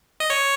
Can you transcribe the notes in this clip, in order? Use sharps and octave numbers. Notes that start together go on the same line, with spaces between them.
D#5
C#5